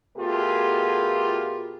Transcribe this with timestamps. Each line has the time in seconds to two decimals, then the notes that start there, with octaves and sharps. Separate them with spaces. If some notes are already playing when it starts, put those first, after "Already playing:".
0.17 B2 A3 F4 G4 G#4 A#4